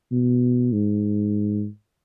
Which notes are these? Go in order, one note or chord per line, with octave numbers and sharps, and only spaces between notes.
B2
G#2